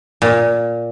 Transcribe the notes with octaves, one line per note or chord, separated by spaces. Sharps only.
A#2